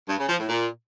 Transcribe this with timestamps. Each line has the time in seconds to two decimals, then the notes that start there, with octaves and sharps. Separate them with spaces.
0.09 G2
0.19 C#3
0.29 F3
0.39 A2
0.49 A#2